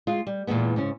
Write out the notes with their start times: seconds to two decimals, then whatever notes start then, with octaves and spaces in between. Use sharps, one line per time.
0.07 G#3 F4
0.27 G3
0.47 E2 A#2 E3 G#3 B3
0.76 G#2 C#3 C#4